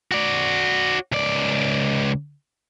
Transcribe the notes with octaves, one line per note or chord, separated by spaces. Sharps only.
F#4 D5
C#2 D5